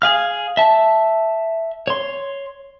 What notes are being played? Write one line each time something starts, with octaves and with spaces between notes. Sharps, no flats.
G#4 F5 F6
E5 A5
C#5 C6